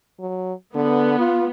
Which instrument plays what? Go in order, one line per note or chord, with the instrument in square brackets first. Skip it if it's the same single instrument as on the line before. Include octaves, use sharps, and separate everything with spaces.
[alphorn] F#3
[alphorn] D3 [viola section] B3
[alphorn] F4